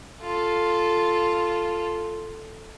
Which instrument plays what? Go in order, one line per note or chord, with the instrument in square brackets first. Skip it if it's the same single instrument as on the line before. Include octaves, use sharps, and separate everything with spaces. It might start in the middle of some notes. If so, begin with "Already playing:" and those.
[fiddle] F4 A4